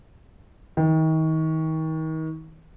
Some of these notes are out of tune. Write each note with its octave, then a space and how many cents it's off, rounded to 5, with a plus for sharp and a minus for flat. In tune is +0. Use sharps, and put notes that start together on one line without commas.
D#3 +35